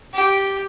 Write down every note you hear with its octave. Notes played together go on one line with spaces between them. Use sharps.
G4